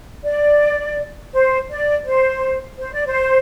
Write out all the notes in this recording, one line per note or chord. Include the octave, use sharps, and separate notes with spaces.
D5
C5
D5
C5
C5
D5
C5